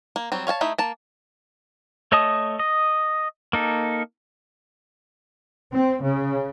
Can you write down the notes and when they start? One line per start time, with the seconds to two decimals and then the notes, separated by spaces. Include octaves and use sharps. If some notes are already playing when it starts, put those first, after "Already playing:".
0.16 A#3
0.32 F#3 G3 C4
0.47 C#5 F5 G5 A5
0.61 A3 D#4 E4 E5
0.78 A#3 A5
2.12 A3 C#5 D#5 A5 D#6
2.59 D#5
3.53 A#3 D#4 A4
5.72 C4
6.02 C#3